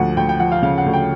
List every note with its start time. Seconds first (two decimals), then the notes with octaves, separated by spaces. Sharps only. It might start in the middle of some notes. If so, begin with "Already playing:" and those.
Already playing: D2 F3 F#5
0.17 D2 G5
0.29 G5
0.40 F3 F#5
0.52 F5
0.62 C#3 F5
0.78 F#5
0.86 D2
0.93 G5